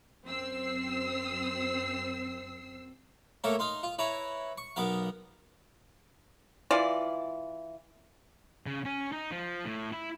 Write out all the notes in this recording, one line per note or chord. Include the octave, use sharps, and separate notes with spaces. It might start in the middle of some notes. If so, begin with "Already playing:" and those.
F#2 C4 E6 C7
A3 A#3 A4 A#4 C#5
D#4 F5 C6
F4
E4 B4 C#5 A#5
C#6
B1 B3 A#4 F5
E3 F4 D5
C#3
C#4
D#4
F3
A2
E4